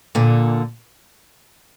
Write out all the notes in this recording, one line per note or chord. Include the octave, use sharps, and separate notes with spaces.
A#2 D3